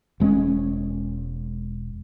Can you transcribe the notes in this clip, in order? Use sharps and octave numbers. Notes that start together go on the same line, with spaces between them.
E1 G#3 B3 C#4